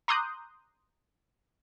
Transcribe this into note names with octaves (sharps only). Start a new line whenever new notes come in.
A#5 C6 D6 D#6 F#6 G6